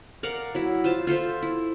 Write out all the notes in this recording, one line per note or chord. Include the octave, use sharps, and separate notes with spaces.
A#4 D5 F5 F#5
F#3 E4
F4 C5 A5
F4 A4 C5 E5
E4